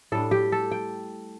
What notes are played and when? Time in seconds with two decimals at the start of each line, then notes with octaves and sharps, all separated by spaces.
0.12 A2 G3 D4 A4
0.31 G4
0.52 A4
0.71 G5